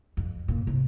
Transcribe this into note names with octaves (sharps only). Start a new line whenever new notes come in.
F2
A#2
C3